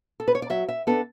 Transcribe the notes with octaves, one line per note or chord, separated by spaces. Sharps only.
A4
B4
C#5
D5
F#3 E5
E5
B3 D4 A4